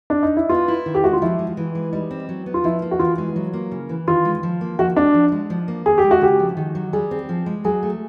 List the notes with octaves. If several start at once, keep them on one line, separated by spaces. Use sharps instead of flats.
D4
D#4
E4
B3 F4
E4
D#3
G4
G#3 F#4
F4
F3 E4
G#3
E3
G#3
G3 D#4
C4
F#3
B3
F4
F3 E4
A#3
F#4
E3 F4
G#3
F#3
A#3
C#3
E3
D#3 F4
G#3
F3
A#3
F3 F#4
G#3 D4
F3
G#3
F3
A#3
D#3 G#4
G4
G#3
F#4
C#3 G4
F3
D#3
F#3
G3 G#4
C4
F3
G#3
F#3 G#4
A3